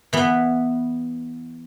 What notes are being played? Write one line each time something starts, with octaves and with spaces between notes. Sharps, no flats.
E3 B3